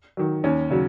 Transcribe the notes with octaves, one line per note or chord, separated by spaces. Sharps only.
D#3 F#3
D#2 C#4
C#3 F#3